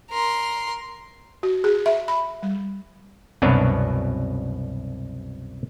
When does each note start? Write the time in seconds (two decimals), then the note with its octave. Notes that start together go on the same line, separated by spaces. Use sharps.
0.11 A#4 C6
1.43 F#4
1.64 G#4
1.86 E5
2.08 B5
2.43 G3
3.42 C2 F#2 B2 D4 B4 C#5